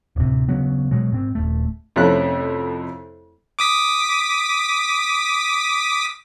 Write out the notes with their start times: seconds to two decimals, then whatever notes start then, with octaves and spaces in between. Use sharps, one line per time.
0.16 D1 C3
0.49 C#3 F#3 B3
0.91 B2 F#3 G#3
1.12 G#2 C4
1.35 D#1 A3
1.96 F2 C3 A3 C#4 E4 F#6
3.59 D6 D#6 B6